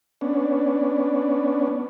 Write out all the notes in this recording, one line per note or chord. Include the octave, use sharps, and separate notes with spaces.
B3 C#4 D4